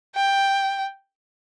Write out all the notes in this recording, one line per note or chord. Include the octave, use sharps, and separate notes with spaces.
G5